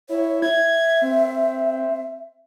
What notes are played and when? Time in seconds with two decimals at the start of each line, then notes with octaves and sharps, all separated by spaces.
0.09 E4 C#5
0.42 E5 G#6
1.02 C4